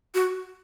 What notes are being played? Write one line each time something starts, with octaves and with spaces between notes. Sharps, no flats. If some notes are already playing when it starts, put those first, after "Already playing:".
F#4